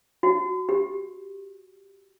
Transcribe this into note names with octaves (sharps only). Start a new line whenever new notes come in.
F#4
G4